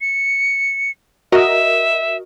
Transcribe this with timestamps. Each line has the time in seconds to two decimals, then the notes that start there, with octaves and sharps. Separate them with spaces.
0.01 C#7
1.32 F#4 A#4 D#5 E5